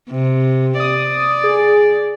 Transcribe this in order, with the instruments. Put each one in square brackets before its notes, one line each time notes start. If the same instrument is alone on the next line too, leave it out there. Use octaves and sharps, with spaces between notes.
[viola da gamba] C3
[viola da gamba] D5 [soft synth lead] D#6
[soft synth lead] G#4